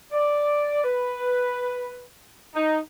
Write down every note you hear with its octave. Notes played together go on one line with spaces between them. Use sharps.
D5
B4
D#4